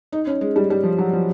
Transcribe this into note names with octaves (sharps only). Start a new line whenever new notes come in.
D#4
C#4
G#3
G3
G3
F3
F#3
F3